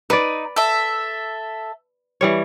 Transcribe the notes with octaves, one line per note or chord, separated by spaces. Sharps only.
D#4 B4 D5
A4 E5
E3 G3 C#5